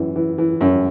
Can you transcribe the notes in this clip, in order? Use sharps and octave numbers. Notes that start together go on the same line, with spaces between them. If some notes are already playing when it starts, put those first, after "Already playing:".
Already playing: F#2 E3
E3
E3
F#2